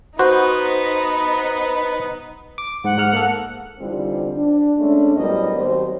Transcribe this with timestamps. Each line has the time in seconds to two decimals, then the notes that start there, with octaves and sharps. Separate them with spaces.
0.19 B3 D#4 F#4 B4 C5
2.58 D6
2.84 G#2 F#5
2.98 G#2 F6
3.13 A#3 A4
3.79 E2 D3 G3 C4 D#4 F4
4.36 D4
4.76 G#3 A3 C#4 D4
5.16 A2 F#3 G3 B3 A#4 D#5
5.57 D#2 F#3 C4 C5